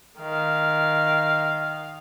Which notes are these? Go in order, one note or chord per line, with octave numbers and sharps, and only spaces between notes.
D#3 F5